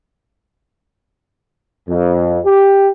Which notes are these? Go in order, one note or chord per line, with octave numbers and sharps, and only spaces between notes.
F2
G4